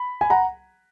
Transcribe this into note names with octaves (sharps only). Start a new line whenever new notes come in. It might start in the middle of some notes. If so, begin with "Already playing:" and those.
Already playing: B5
G#5
F#5 A#5